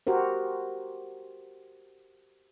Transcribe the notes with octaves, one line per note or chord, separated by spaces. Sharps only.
F#4 G4 A#4 C5